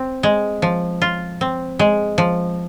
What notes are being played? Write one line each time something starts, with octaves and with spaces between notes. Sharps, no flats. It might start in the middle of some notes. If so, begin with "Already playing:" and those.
Already playing: C4
G#3
F3
F4
C4
G#3
F3